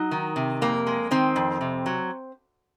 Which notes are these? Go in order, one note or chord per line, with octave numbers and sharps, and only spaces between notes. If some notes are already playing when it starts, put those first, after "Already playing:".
Already playing: F#3 D#4
D#3
C3
F2 A#3
G#3
D#3 C4
F2
C3
F#3